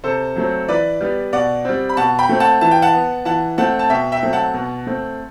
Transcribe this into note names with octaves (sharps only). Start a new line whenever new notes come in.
C3 A4 C5
F#3 A3 C4
E3 B4 D5
G3 B3
B2 D5 F#5
G3 C4
B5
B2 F#5 A5
G5 B5
A3 C4
F#5 A5
E3 A5
G5
F#5 A5
B3
E3 F#5 A5
A3 C4 F#5 A5
A5
B2 E5 G5
E5 G5
F#3 A3 C4
F#5 A5
B2
A3 C4